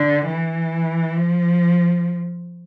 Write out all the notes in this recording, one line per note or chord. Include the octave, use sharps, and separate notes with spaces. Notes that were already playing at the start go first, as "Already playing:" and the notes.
Already playing: D3
E3
F3